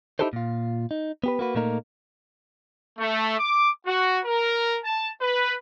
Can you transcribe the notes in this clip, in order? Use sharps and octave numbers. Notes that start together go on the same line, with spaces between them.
D#4 E4 G4 A4 B4 C5
A#2 F4
D#4
B3 G4 B4
A#3 F#4 B4
A#2 A3 A#3 D#4 A#4
A3
D6
F#4
A#4
A5
B4